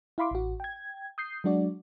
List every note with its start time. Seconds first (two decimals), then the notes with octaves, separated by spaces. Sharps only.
0.18 E4 F5 B5 C6 D6
0.31 A1 F#4
0.60 G5 G#6
1.18 D#6 G6 C7
1.44 F#3 G#3 D4 F#4 D5